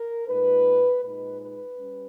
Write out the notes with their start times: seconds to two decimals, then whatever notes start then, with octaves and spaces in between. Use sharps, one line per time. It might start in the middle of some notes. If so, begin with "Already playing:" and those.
Already playing: A#4
0.28 A#2 G#3 D#4 B4
1.02 A#2 G#3 D#4 B4
1.40 B4
1.77 G3 C#4